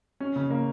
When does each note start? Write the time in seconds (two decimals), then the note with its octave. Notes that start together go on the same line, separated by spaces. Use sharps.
0.20 C#4
0.36 C#3
0.50 A#3